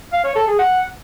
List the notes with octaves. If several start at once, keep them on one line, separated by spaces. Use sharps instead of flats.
F5
C#5
A4
G#4
F#5